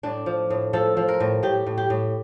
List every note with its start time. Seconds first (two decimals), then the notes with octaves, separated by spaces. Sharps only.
0.03 A2 D4
0.26 F3
0.50 A2
0.73 F3 A4
0.97 F3
1.08 A#4
1.20 A2
1.43 A2 G4
1.66 A2
1.78 G4
1.90 A2